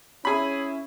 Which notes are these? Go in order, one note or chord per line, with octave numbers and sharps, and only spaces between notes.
C#4 E4 G#4 B5